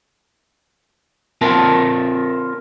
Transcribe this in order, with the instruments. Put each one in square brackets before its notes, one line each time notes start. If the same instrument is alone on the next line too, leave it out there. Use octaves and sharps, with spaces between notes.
[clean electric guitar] C4 F4 A#4 A5